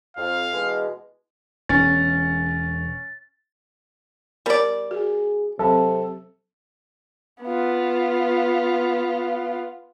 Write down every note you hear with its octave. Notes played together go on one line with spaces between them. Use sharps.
F2 F5
B2 E3 G#3
E1 C#4 A6
G3 B3 A#4 D5
F#4 G#4
C3 F#3 C4 A4
B3 F4